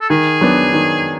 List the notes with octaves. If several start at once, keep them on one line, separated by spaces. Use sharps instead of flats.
A4
D#3 G#4
F#3 B3 D4
D#3